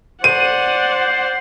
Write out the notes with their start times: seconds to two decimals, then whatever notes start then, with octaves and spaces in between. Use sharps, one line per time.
0.24 C5 D5 F#5 D#7